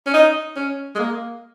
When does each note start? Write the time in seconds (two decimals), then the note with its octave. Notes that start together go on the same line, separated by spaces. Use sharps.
0.06 C#4
0.14 D#4
0.56 C#4
0.95 G#3
0.99 A#3